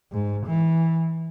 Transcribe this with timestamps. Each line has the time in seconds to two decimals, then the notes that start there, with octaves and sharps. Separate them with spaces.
0.12 G#2
0.46 E3